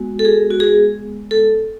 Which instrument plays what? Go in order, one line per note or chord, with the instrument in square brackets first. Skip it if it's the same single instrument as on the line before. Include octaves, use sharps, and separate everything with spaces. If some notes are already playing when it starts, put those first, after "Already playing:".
Already playing: [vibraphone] G#3 B3 F#4
A4
G#4
F#4
G#4
A4